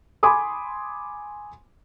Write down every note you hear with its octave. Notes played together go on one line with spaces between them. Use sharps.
G#5 B5 C6 D6 D#6